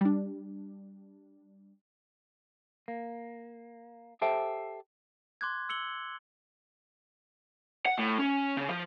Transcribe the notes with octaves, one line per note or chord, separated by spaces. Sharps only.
G3 D4
A#3
G4 A4 C5 E5 G5 A5
C6 D6 F#6 G#6
E6 C#7 F#7 G7
F#5
A2
C#4
C#3
F3